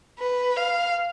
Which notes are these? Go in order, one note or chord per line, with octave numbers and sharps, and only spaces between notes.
B4
F5